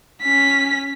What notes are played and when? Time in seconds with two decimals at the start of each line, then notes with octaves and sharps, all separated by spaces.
0.22 C#4 B6